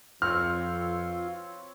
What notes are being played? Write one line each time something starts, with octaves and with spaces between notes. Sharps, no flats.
F2 C4 F4 B4 C#5 F6